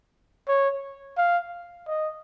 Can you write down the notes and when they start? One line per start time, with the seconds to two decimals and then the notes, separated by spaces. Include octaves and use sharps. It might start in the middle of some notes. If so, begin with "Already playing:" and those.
0.48 C#5
1.17 F5
1.88 D#5